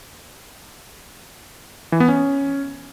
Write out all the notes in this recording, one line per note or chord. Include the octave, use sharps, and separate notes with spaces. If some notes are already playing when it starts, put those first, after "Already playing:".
E3
B3
C#4